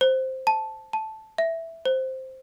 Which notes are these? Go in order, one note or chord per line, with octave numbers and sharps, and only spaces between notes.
C5
A5
A5
E5
C5